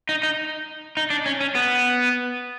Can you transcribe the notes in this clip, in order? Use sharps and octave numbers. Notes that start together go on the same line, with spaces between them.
D#4
D#4
D#4
D4
C#4
C#4
B3